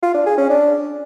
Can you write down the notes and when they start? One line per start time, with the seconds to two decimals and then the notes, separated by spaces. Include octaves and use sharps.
0.03 F4
0.14 D4
0.26 G#4
0.38 C#4
0.50 D4